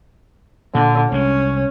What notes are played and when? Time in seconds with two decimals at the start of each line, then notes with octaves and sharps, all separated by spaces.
0.75 A#2 D3
1.12 C2 G#3 C#4